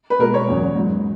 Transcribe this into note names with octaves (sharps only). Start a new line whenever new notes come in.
B4
B2 G#3 A#4
C#5
E2 C#3 F#3
G#2 F#3